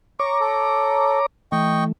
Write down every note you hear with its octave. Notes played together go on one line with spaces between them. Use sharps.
C#5 A#5 C#6 D6
A4
E3 A3 D#5 G5 C#6